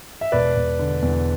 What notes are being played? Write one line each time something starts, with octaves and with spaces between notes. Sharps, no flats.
E5
E1 B4 D5
E1
D3
E2